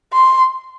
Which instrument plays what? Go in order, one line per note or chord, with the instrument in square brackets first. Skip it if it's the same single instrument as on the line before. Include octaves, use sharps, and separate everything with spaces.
[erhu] C6